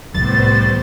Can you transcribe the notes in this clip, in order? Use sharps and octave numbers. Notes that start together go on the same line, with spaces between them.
C2 A2 E3 G3 B3 C5 A6